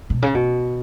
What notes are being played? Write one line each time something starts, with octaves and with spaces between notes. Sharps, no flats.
B2
C#3
B2